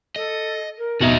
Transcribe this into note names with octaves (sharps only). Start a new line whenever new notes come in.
A4 D#5
A#4
F2 B2 D#4 F#4 D#5 E5